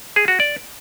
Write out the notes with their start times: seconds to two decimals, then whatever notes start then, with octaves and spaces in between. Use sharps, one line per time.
0.16 G#4
0.28 F#4
0.40 D5